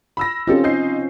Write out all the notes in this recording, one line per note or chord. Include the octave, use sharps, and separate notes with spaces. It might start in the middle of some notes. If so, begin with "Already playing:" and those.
B5 E6 A#6
C4 C#4 D#4 F4 G4 A4
D#4 G6 C7